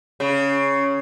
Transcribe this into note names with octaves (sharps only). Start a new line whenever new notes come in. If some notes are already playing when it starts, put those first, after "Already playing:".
C#3